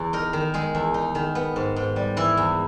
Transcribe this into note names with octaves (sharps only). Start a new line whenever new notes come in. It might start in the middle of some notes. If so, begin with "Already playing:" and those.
Already playing: E2
D#4 A#4
D#3
G#3 G#4
E2
D#4
D#3
B3
G#2
G#2
G3
E3 E4
E2